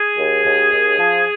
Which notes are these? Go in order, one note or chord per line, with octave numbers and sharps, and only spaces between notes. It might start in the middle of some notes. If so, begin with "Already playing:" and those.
Already playing: G#4
D#2
D#2
D#2
F3